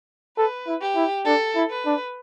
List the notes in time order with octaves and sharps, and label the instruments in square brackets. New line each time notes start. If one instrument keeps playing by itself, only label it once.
[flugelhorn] A4 [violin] B4
[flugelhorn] E4
[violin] G4
[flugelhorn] E4
[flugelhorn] D4 [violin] A4
[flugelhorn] E4
[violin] B4
[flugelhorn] D4